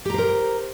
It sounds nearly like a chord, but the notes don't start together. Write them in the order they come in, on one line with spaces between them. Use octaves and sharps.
G4 A#5 C5 A#4